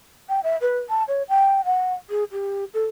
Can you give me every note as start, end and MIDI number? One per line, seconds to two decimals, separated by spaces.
0.29 0.40 79
0.43 0.56 76
0.61 0.79 71
0.89 1.03 81
1.08 1.22 73
1.29 1.64 79
1.64 1.93 78
2.09 2.24 68
2.32 2.64 67
2.73 2.86 69